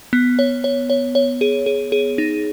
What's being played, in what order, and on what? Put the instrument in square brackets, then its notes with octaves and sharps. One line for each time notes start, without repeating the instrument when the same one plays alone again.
[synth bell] B3
C#5
C#5
C#5
C#5
G#4
G#4
G#4
D#4